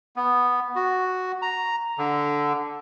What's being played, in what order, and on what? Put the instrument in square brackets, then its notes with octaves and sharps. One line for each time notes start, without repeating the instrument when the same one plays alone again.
[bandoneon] B3
F#4
A#5
D3